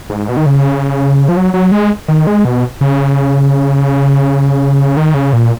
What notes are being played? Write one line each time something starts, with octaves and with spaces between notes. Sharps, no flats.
G#2
B2
D#3
C#3
F3
F#3
F#3
G#3
D#3
G#3
B2
C#3
D#3
C#3
A#2